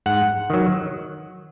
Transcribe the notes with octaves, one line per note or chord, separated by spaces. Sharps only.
G#2 F#5
D#3 F#3